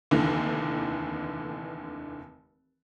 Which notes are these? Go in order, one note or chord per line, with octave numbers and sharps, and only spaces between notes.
F1 D#2 D3 E3